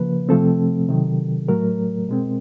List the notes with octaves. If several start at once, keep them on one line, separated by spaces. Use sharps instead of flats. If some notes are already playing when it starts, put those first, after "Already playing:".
Already playing: C#3 F3 A#3 B4
C3 F3 A3 C4 A4
C3 D#3 F#3
A2 F#3 A3 A#4
B2 G#3 C4